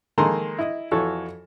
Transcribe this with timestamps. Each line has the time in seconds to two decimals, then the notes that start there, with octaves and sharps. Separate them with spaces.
0.18 D#3 G#3 A#3 A4 A#5 C6
0.59 E4 D#5
0.92 F2 E3 F#4 A4 C#5